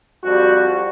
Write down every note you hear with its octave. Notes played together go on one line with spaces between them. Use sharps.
F2 G3 F#4